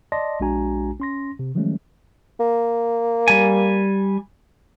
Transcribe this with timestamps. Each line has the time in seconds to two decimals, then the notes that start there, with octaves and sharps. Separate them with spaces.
0.12 D5 D#5 A5 C6 A#6
0.40 A#1 G#3 D4 F#4 G#5 A#5
1.00 C#4 C6 A#6
1.39 C3
1.55 D#3 F3 F#3 G#3 A3 C#4
2.40 A#3
3.28 G3 G#5